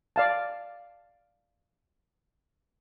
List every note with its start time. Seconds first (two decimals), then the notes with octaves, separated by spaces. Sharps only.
0.16 D5 F5 A5